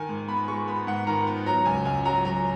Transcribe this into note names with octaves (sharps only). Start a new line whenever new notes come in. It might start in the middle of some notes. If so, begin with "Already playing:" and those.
Already playing: D#3 G#5
G#2
B3 B5
G#3 C#6
B3 B5
G#2 F#5
D#3 A#5
B3
F#3 A#5
C#2 G#5
C#2 G#5
F#3 A#5
F#3 A#5